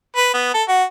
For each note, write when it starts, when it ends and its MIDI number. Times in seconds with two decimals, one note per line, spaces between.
0.17 0.30 71
0.34 0.54 59
0.54 0.63 69
0.68 0.84 66